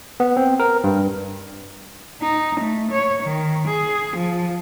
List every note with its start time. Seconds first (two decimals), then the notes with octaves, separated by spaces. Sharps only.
0.20 B3
0.37 C4
0.60 A#4
0.84 G2
2.21 D#4
2.60 A3
2.91 C#5
3.23 D#3
3.67 G#4
4.16 F3